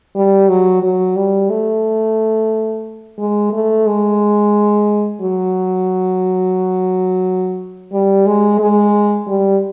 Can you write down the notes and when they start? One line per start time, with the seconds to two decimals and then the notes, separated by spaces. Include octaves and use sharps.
0.15 G3
0.49 F#3
0.83 F#3
1.16 G3
1.50 A3
3.19 G#3
3.53 A3
3.86 G#3
5.22 F#3
7.93 G3
8.26 G#3
8.59 G#3
9.27 G3